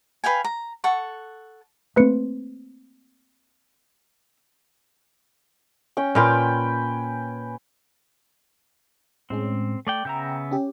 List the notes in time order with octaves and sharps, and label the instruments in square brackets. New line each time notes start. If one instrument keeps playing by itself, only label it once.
[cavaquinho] B4 F5 G5 G#5
A#5
A4 F#5 C#6
[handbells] A3 B4 C#7 [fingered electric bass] A#3 C4
[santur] C#4 G5
[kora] A#2 F4 [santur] B4 G5 G#5
[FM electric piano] A2 G#3 C#4 [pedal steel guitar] C4
[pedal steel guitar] A3 D5 G5
[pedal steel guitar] C#3 B3 E5 [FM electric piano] G5 A#5
[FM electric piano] C#4 G4